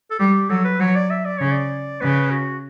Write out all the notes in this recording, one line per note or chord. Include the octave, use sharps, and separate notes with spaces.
A4
G3 G4
F#3 A4
B4
F#3 C#5
D5
E5
D5
C#3 C#5
D5
C#3 B4
F#4